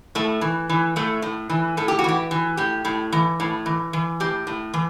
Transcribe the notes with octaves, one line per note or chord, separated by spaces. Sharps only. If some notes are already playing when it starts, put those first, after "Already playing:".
A2 A3
E3
E3
A2 A3
A2
E3
A2 A4
G4
F#4
E3 G4
E3
A2 G4
A2
E3
A2
E3
E3
A2 G4
A2
E3